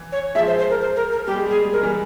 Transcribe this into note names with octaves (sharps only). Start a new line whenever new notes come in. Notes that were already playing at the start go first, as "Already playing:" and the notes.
Already playing: E3
C#5
F3 G#3 E5
C5
C5
A#4
C5
A#4
A#4
G3 G4
G#3
G3 G#4
G#3
G3
G#3 A#4
E3 G3